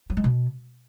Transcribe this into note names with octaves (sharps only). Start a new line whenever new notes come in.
F#3
G#3
B2